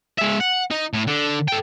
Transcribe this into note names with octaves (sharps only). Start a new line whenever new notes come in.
G#3 E5
F#5
D#4
A2
D3
A4 G5